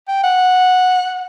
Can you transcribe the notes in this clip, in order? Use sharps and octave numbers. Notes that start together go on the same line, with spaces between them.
G5
F#5